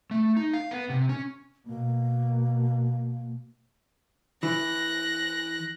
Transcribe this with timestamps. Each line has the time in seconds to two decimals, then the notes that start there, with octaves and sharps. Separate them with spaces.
0.11 A3
0.37 D#4
0.54 F5
0.71 B3
0.90 C3
1.09 C#4
1.66 B2 A#3
4.43 E3 F#6 A#6